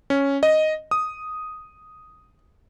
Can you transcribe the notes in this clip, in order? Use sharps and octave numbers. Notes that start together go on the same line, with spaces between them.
C#4
D#5
D#6